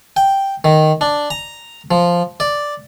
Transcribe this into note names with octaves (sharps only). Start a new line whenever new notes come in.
G5
D#3
D4
A#5
F3
D5